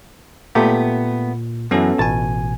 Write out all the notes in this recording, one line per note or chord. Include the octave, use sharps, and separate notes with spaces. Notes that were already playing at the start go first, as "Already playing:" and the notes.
A#2 A3 B3 G4
F#2 E3 B3 C#4 A4
A1 B2 G#5 A5